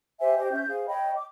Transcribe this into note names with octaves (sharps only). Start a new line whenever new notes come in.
G4 C5 E5 G#5
G4 C5 D#5
C#4 E5 G6
G#4 C5 F5
C#5 D#5 G5 B5
D6